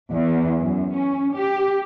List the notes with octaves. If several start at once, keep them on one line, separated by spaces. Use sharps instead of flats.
E2
F#2
C#4
G4